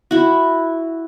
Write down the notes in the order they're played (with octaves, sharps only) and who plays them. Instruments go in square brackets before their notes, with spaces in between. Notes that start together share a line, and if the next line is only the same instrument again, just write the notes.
[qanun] E4 F#4